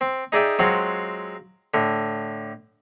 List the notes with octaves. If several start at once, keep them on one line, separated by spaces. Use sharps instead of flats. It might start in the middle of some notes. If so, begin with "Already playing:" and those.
C4
D#4 G#4 D5 E5 G5
F#3 G#3 C4 F4 F#4
A2 D3